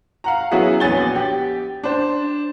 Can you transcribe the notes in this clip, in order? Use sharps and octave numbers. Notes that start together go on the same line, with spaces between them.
F5 F#5 A#5
F#3 B3 C#4 E4 F#4 G#4
A#1 B3 C#5 G#5 A6 G7
G4
D4 C5